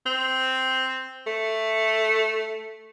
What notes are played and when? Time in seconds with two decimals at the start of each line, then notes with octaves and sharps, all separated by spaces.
0.06 C4
1.27 A3